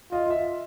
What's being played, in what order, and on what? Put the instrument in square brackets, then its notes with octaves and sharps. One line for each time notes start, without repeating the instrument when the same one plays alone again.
[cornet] F4 [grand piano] D#5
[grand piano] D#5
E5